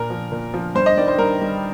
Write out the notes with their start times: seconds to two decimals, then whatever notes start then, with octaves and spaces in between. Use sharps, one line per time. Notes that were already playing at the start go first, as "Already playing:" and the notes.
Already playing: A#2 A#4
0.10 F3
0.32 A#2
0.54 F3
0.75 G2 C5
0.86 D#5
0.97 D#3 G3 D5
1.08 C5
1.18 G2 A#4
1.41 D#3 G3